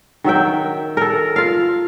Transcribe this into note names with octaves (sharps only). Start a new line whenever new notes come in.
D#3 F#3 E5 G5
A4 A#4
F4 F5